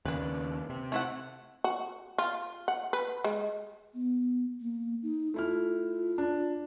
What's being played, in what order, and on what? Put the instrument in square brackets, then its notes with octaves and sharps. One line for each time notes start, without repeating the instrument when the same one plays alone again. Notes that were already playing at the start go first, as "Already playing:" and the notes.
[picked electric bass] D#2 C#3 [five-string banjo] D4 B4
[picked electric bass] C3
[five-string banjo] A3 E4 F#5
[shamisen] F#4
F4
F#5
B4
G#3
[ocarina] B3
A#3
D#4
[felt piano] A3 E4 F6 [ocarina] F4
[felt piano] D4